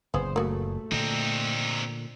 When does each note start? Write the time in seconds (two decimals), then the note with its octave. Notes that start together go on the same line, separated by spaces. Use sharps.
0.14 F#1 A#2 B3 G#4 C5
0.36 A3 A#3 F#4 G#4
0.92 A#2 D3 C4 D#4